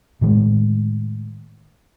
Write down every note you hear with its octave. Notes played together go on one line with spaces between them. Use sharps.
A2 D#3 G#3